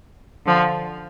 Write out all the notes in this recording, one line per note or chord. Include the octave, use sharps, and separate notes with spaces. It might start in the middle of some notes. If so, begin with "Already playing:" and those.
D3 F3